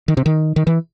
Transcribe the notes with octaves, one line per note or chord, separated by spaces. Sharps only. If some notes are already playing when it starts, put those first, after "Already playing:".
D#3
C3
D#3
D#3
E3